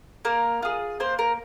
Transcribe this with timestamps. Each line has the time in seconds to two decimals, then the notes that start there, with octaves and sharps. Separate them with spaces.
0.25 A#3 A#4
0.62 F4 G#4
1.00 A#3 C5
1.19 A#4